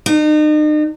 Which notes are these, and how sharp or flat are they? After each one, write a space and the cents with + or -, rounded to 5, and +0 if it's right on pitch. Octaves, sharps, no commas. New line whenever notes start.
D#4 -40